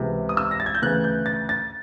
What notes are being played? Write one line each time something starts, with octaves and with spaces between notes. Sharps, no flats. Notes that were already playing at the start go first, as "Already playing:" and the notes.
Already playing: C#2 C3 E3
D#6
E6
A#6
A6
G#6
G6
D2 C#3 E3 F#6
G6
A6
A6